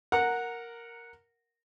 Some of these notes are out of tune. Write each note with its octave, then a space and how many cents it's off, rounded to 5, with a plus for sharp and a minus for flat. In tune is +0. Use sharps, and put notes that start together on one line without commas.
A#4 +0 F#5 -10 A#5 -10